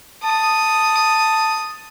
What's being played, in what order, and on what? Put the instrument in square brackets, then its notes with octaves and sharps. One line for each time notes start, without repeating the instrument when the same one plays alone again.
[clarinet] A5 [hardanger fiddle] D#6